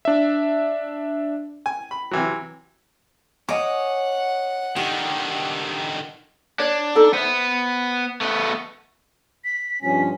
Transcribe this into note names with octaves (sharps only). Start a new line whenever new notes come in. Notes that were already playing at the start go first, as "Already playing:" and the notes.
D4 E5
G#5
B5
C3 E3 F#3
C#5 D#5 F#5 G#5 D6
D3 D#3 G4
D4 C#5 D5
D#4 A4 D5
B3 C5 E5
A3 B3
B6
G2 B2 F3 C#4 B6